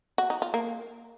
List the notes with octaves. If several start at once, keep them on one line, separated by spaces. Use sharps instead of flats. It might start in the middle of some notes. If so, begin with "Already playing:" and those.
F#4
D#4
F4
A#3